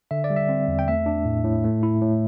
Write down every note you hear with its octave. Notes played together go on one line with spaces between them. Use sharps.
D3 E5
D5
G3
E5
C4
E2
G5
A3 E5
D4
A2
A2
A3
E4
A2